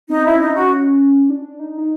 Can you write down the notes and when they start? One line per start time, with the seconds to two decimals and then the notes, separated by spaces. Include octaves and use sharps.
0.09 C4 D#4
0.21 C4
0.25 C#4 E4
0.40 D4 D#4
0.50 C#4 F#4
1.30 D4
1.60 D#4
1.77 D#4